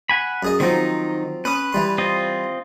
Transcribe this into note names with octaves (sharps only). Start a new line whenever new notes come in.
F#5 G#5 B5
F#2 G#4 D#5
D#3 F3 F#3 C4 D#4
C#4 B4 B5 D#6
E3 G3 C6
C4 F4 D#5